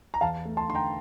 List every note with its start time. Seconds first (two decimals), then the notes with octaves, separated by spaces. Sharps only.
0.14 A#5
0.21 E2 F5 A5
0.45 A3
0.57 A5 C6
0.69 D3 C6
0.75 G5 A#5